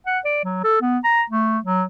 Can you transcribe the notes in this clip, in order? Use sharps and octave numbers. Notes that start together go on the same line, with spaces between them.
F#5
D5
F#3
A4
B3
A#5
A3
F#3